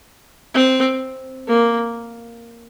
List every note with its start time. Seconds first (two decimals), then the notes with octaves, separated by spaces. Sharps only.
0.54 C4
1.48 A#3